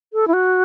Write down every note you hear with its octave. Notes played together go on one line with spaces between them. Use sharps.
A4
E4
F#4